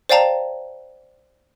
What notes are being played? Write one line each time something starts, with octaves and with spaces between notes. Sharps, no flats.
C5 D5 F5 G5 A5 A#5